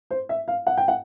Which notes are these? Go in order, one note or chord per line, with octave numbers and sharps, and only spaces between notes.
C5
E5
F5
F#5
G5
F#5